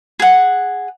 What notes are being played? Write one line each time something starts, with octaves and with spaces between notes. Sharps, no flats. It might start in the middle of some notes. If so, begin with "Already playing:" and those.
G#4 F#5